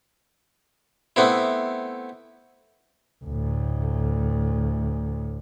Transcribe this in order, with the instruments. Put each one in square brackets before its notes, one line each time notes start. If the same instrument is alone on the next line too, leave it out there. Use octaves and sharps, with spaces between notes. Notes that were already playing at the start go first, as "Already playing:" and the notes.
[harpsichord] A3 B3 C4 E4
[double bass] D2 A2